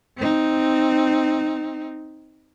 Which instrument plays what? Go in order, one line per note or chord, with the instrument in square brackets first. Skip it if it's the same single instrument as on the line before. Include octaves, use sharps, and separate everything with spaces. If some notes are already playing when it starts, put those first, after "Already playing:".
[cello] C4 D#4